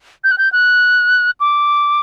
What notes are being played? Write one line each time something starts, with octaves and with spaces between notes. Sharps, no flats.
G6
F#6
G6
F#6
D6